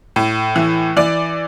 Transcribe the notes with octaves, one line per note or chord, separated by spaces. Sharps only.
A2
E3
E3 D5